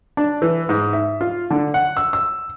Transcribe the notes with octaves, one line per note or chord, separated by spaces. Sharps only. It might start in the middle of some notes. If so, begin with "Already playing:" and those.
D4
E3
G#2
E5
F4
D3
F#5
E6
E6